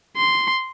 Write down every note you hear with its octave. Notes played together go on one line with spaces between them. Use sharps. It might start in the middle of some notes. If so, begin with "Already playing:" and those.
C6